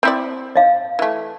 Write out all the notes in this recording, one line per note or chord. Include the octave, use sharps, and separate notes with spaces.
C4 E4 D5
D#5 F5
E3 A3